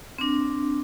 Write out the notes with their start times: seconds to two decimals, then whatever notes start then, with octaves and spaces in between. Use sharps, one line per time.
0.18 C4 D4